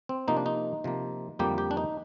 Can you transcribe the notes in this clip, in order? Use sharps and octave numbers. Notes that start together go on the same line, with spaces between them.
C4
C3 F3 A#3 D#4
D4
D#4
C3 F3 A#3
F2 D3 G3 A#3 G4
G4
D4
D#4